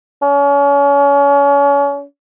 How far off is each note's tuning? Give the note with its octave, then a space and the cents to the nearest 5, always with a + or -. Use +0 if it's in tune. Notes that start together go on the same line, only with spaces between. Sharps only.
C#4 +35